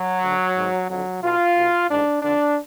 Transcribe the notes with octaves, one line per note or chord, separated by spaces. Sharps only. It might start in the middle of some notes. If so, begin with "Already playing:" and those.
Already playing: F#3
D2 D3
G#1 G#2
F2 D3 F#3
B1 B2 F4
B1 B2
A1 G#2 D4
F2 D3 D4